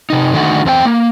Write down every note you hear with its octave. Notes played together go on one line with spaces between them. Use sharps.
C3 D#4
D3 D#3 A3 D4 F#4
E2 C4 F4 G5
A#3